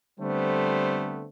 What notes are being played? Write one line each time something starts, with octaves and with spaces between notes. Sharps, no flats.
D3 G3 A3 B3 C4 C5